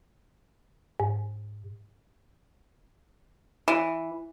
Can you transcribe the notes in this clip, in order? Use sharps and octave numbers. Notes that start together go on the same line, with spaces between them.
G#2
E3